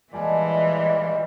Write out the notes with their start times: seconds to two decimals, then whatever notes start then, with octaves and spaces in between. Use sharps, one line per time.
0.13 A#2 E3 G3 G#3 D5 D#5 G#5 A5